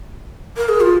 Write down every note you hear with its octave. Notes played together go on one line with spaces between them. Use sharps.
A#4
G#4
F4